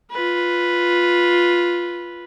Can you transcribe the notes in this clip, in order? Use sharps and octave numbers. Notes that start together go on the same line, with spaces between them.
F4 B4